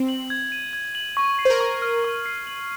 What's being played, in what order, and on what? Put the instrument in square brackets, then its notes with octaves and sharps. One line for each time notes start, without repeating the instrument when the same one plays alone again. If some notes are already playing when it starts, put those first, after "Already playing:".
Already playing: [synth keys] C4
[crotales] F#7
G#6
D#7
G#6
F#7
C#6
C7
[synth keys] C5
A#4
[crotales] C#6
F6
C#6
C7
F#7